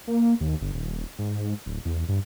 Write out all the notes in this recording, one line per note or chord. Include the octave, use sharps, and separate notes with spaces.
A#3
D#2
G1
D#1
G#2
D1
E2
G2